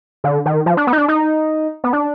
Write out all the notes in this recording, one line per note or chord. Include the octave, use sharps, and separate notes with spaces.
D3
D#3
F3
D4
B3
D#4
D4
D#4
B3
D4